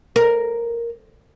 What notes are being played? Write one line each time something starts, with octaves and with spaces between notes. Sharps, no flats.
A#4